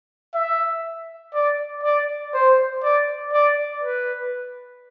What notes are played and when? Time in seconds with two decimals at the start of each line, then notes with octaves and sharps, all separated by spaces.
0.35 E5
1.34 D5
1.84 D5
2.33 C5
2.83 D5
3.33 D5
3.83 B4